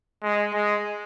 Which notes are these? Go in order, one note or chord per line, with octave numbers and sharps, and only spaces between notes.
G#3
G#3